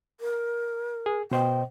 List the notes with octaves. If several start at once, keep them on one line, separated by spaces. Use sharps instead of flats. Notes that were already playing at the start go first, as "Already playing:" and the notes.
A#4
G#4
B2 C5 D#5 G5